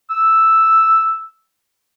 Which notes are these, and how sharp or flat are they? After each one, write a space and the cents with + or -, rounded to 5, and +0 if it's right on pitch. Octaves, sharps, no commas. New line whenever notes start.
E6 +0